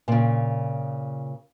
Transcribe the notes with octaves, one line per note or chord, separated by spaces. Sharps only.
A#2 C#3